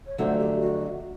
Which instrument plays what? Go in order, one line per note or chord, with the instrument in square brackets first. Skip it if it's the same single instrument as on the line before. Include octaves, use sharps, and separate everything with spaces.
[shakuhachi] C#5
[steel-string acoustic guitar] F2 D3 F#3 A3 [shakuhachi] C5 C#5
[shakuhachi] G4
F#4